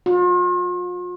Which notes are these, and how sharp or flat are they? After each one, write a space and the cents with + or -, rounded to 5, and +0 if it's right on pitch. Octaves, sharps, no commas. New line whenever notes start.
F4 +40